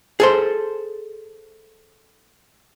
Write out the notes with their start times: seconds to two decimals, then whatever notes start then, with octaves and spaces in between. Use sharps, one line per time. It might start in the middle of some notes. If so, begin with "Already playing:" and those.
0.20 G#4 A4 C5